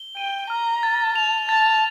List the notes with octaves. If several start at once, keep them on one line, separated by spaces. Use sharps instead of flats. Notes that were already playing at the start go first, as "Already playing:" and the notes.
Already playing: G7
G5 D#7
A#5 F6
A6
A5 F7
A5 A6